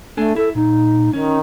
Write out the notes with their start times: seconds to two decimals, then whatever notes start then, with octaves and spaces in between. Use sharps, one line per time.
0.17 A3 D4 A4 G#5
0.36 E4 A4
0.55 A#2 D#4
1.13 D#3 C#4